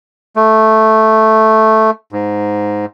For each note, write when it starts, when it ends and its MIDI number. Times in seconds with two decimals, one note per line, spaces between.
0.36 1.91 57
2.12 2.86 44